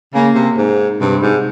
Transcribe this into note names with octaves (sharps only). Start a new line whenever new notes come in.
C#3 A#3
C3
G#2
G2 C3
G#2